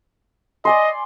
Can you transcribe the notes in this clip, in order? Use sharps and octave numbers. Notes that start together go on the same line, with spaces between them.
D5 D#5 G#5 C6